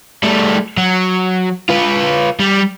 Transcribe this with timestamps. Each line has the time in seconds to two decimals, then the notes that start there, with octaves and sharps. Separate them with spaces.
0.23 G3 A3
0.77 F#3
1.69 F4 B4
2.40 G3